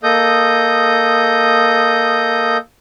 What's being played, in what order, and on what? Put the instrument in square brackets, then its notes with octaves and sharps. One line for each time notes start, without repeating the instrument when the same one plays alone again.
[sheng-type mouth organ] A#3 A4 D#5 D#6 G6